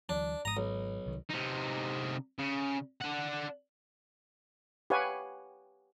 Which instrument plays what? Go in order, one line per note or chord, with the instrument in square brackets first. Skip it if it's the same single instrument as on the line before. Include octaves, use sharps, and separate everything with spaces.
[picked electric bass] D2 E3 F#3 [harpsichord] D4
[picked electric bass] G#1 G#2 [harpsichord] A#5 D#6
[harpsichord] B1
[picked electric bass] C2 D#3
[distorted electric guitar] C3 D#4
C#3
D4 F#5
[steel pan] G4 B4 C#5 F5 F#5 G#5